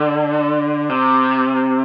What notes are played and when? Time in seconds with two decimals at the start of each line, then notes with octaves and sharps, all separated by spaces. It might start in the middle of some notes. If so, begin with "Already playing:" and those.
Already playing: D3
0.90 C3